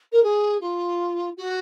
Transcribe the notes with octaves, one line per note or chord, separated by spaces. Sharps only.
A#4
G#4
F4
F#4